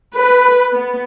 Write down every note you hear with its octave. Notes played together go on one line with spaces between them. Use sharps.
B4
B3